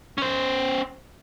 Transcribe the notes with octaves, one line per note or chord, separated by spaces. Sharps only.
C#4 C5